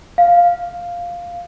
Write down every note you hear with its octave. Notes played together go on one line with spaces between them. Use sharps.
F5